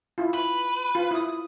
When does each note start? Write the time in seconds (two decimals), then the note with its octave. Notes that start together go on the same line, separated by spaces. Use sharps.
0.18 E4 F4
0.34 B4
0.95 F4
1.11 E4 D#6